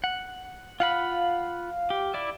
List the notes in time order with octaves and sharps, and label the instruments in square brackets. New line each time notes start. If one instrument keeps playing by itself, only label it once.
[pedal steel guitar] F#5
[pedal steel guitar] F4 F#5 B5 [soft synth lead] F5
[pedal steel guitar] G4
E4 D5 E5